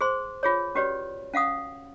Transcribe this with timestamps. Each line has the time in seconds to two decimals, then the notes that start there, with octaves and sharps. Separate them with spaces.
0.01 G#4 C5 C6
0.43 F4 G#4 C#5
0.75 C#4 F#4 G4 B4 C#5 D5
1.33 C#4 F5 F#5 D#6